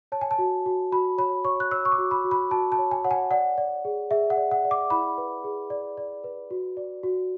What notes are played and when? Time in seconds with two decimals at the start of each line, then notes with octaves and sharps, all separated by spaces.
0.12 C#5 A5
0.21 G#5
0.31 A5
0.38 F#4
0.66 F#4
0.92 F#4 B5
1.18 C#5 B5
1.45 C#5 C#6
1.60 F#6
1.71 C#5 E6
1.85 C#6
1.92 D6
1.98 F#4
2.11 B5
2.24 F#4
2.31 B5
2.51 F#4 A5
2.72 A5
2.79 C#5
2.91 G#5
3.05 C#5 F#5
3.11 G#5
3.31 D5 F#5
3.58 D5
3.85 G#4
4.11 G#4 E5
4.30 F#5
4.37 D5
4.51 F#5
4.65 D5
4.71 D6
4.90 E4 B5
5.18 B4
5.44 G#4
5.70 D5
5.97 D5
6.24 B4
6.51 F#4
6.77 D5
7.03 F#4